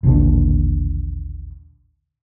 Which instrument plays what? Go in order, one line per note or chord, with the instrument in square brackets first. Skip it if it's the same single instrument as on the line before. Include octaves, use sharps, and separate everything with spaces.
[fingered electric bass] A1 D#2 A#2 D3